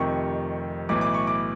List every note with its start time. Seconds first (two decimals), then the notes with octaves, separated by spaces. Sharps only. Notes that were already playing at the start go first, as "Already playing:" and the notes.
Already playing: F1 F2 C3 D#3 C#6
0.89 B1 A2 E3 D6
1.01 D6
1.14 C#6
1.27 D6